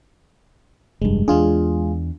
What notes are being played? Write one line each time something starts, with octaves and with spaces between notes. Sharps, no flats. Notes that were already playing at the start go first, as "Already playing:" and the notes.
F1 G2 G#3
E2 G#3 D4 F4 G#4